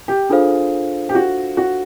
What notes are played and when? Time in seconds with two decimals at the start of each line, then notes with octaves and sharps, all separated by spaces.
0.08 G4
0.29 D4 F4 G#4 A4 C5 F5
1.09 G4
1.15 F#4
1.57 F#4